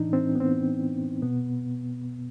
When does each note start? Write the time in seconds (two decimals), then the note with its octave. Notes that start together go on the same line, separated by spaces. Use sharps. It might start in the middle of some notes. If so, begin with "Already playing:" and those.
Already playing: A2 E3 D4 D#4
0.13 C4
0.35 B3
0.40 C4
1.22 B2 B3